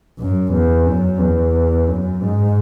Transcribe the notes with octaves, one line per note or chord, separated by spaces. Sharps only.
F#2
E2
F#2
E2
F#2
G#2